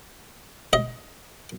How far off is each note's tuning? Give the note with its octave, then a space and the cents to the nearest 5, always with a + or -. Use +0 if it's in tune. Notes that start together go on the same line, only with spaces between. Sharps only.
D#5 +20